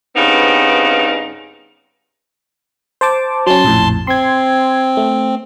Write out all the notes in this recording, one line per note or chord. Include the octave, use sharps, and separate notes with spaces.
G2 C#3 B3 C4 D#4
C5 A5 D6
F#3 C#4 A5 C6
A#1 F2 A2
C4 C6 G#6
A3